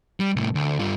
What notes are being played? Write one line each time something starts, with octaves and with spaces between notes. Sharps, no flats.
G3
C2 A2
D2
G2 F4